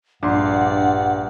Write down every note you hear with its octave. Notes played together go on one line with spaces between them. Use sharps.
A#1 G2 D4 F#5 C6